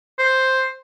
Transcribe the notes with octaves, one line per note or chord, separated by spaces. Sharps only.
C5